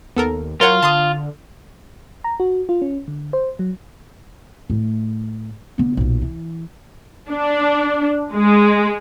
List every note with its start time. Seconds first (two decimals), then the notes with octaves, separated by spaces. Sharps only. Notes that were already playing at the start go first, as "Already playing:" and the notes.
0.17 D#2 B3 A4 A#4
0.61 F#3 F4 A#4 C#5 F#5
0.83 D3 A5 C6 D#6
2.24 A#5
2.40 F#4
2.69 F4
2.82 C#4
3.08 D3
3.33 C5
3.59 F#3
4.70 A2 A3
5.78 D3 B3
5.97 B1 A#2
6.21 E3
7.30 D4
8.32 G#3